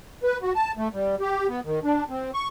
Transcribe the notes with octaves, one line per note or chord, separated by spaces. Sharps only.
B4
F#4
A5
A3
G3
G4
B3
D#3
D4
C4
C#6